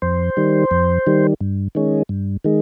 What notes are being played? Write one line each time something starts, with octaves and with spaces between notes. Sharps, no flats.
F2 C5
D#3 G3
F2
D#3 G3
G2
D#3 G#3 C#4
G2
D#3 G#3